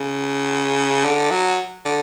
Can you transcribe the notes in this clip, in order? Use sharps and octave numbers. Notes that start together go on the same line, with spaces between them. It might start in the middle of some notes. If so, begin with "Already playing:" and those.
Already playing: C#3
D3
F#3
D3